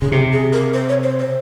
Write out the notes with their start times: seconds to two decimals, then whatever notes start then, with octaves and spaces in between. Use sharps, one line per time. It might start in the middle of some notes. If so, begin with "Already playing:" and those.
0.02 C#3 G#4
0.12 C3 G4
0.33 G#4
0.53 A#4
0.74 C5
0.89 C#5
1.03 C5
1.19 C5